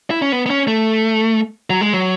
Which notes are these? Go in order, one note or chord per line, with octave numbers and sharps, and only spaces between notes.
E4
C#4
B3
B3
C#4
A3
F#3
G#3
F#3